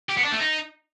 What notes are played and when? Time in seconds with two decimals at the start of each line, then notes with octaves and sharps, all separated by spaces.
0.10 G4
0.17 B3
0.25 D4
0.32 A3
0.40 D#4